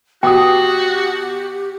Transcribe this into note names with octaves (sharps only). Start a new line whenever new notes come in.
B2 F#4 G4 G5 D6 D#6